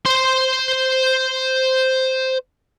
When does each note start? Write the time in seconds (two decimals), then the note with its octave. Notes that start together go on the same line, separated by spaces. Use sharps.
0.05 C5 C6